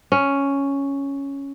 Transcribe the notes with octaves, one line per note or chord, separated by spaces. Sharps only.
C#4